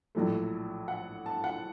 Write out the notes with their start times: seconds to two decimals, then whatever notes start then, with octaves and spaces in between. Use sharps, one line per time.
0.15 A#1 A2 F#3 A3
0.88 F#5
1.26 A5
1.44 F#5